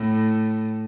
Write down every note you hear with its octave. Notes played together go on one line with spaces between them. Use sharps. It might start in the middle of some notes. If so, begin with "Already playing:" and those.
Already playing: A2